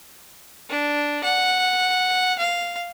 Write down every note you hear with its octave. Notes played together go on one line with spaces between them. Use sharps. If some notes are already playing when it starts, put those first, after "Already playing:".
D4
F#5
F5